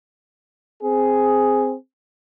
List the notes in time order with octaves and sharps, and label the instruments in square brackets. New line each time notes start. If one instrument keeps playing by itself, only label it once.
[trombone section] C4 G#4